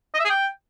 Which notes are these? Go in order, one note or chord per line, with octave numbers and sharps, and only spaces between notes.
D#5
E5
G#4
G5